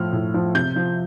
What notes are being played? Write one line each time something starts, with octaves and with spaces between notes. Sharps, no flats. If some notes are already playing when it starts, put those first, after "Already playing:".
Already playing: A2 F3 F6
A2
F3
C3 G6
F3